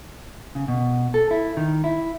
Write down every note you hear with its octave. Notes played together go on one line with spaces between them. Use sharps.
C#3
B2
A4
E4
D#3
E4